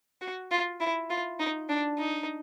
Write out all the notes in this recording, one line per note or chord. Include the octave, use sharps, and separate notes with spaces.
F#4
F4
E4
F4
D#4
D4
D#4